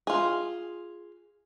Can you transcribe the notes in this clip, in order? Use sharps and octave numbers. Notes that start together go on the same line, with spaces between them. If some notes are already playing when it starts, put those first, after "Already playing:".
F4 G#4